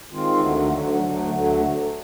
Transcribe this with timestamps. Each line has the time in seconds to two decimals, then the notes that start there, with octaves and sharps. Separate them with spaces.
0.11 D#3 G#3 C4 F4
0.41 D2 D3 F#3 A3
0.71 D2 D3 F#3 A3
1.01 D2 D3 F#3 A3
1.32 D2 D3 F#3 A3